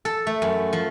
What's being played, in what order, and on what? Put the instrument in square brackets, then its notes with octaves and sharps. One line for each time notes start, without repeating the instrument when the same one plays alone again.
[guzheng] A4
A3
F#2
F3